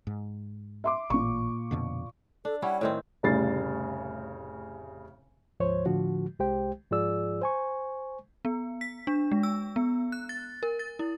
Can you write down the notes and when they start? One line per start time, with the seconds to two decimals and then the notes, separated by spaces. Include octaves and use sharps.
0.07 G#2
0.84 E5 C6 D6
1.10 A1 A#2 C#6
1.71 F2 B2 D3
2.45 D4 A4
2.62 G3 C#4 E4 F#5
2.81 A2 D#3 C4 C#5
3.23 F1 A2 C#3 G3 A6 C7
5.60 D2 G#2 F3 C5 C#5
5.86 A2 D3 F3 F#4
6.39 C2 G#3 G4 C5 G5
6.91 G#2 F3 F4 G#4 D5 E6
7.42 C5 G#5 C#6
8.45 B3
8.81 B6
9.07 D4
9.32 G#3
9.43 E6
9.76 B3
10.12 F#6
10.29 A6
10.63 A#4
10.79 A6
10.99 E4